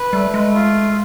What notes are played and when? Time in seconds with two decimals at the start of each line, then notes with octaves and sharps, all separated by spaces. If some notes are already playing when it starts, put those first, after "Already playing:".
Already playing: B4
0.13 G3 A3
0.34 G#3
0.54 F4